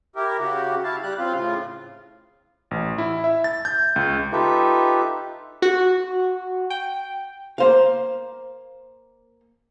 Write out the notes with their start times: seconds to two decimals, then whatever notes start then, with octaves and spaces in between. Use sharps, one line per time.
0.16 E4 G4 A#4
0.39 C#3 F#4 G4
0.84 E4 F5 A5
1.03 G3 G4 F#6
1.19 C#3 C4 F4 F5
1.35 A2 C#3 F4
2.71 A1
2.98 E4
3.24 E5
3.44 A6
3.65 G6
3.96 C#2
4.32 D#4 F4 G4 A4 B4 E5
5.62 F#4
6.70 G5
7.58 A#3 C5 F5